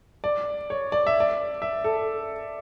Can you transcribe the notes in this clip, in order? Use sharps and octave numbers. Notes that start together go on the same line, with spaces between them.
D5
C#5
D5
E5
D5
E5
A4